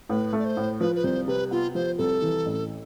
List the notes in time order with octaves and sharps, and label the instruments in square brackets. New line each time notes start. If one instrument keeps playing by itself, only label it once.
[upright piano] A2 [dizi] B4
[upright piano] A3
[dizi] D5
C5
[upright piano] A2
[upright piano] F3 [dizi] B4
[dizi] B4
[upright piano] C2 [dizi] C5
[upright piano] C3 [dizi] B4
[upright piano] B3 [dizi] F4
[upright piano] F3 [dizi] C5
[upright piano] C2 [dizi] A4
[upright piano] E3
A1